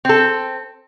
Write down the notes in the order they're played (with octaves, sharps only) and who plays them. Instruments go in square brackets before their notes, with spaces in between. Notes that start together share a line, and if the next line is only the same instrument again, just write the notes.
[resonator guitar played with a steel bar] C4 A4